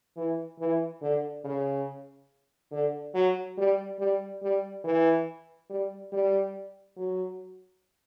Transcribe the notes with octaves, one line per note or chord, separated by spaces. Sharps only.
E3
E3
D3
C#3
D3
F#3
G3
G3
G3
E3
G3
G3
F#3